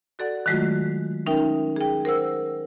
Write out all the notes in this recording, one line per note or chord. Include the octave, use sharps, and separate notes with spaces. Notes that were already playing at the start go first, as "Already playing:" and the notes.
F#4 A4 D5 F#5
D#3 F#3 G#3 A3 F4 F#4
C#4 D#4 A#4 E5 G5
G#4 G5
A#4 C5 F#5 E6